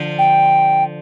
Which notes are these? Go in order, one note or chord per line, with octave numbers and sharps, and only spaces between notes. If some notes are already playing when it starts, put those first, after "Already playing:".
Already playing: D3 F3
G5